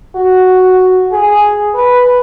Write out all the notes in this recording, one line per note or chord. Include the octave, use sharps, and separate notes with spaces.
F#4
G#4
B4